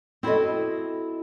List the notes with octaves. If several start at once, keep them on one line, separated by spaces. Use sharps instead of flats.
C4 E4 F#4 A4 D#5